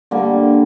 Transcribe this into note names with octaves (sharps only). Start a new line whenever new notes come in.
D3 G3 A#3